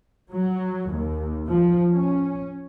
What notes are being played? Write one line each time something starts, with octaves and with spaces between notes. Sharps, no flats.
F#3
D#2
F3
C#4